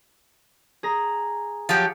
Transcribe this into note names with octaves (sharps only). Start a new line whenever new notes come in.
G#4 A#5
F3 F#3 G4